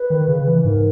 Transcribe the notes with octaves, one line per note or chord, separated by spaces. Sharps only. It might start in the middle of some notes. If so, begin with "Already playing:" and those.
Already playing: B4
D#3
C#3
E3
G#2 A#4